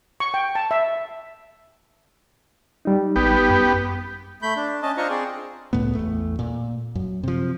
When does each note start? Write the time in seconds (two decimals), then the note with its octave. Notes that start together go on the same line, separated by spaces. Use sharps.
0.20 C#6
0.34 G5
0.55 A5
0.71 E5
2.85 G3 D#4
3.16 A1 B3 G4
3.49 F#2
4.42 A3 B5 G6
4.56 D4
4.83 C#4 D#5 A5
4.97 D4 F4 C5 D#5 A#5 C#6
5.09 C4 G#4 D5
5.73 C#2 A2 A3 B3
5.95 A1 E2 A3
6.39 A#2
6.95 F#2
7.23 C3 F3